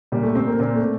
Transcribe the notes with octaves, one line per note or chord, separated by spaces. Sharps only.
A#2 G3
A3
A#2 C4
A#3
A#2 C4
A3